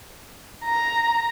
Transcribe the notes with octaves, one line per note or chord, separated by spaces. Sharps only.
A#5